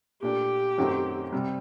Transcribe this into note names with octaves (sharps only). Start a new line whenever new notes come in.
A#2 A3 D4 G4
F#2 D#3 F#3 A3 C4
C3 G3